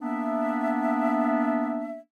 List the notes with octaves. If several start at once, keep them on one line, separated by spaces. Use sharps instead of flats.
A#3 B3 D4 E5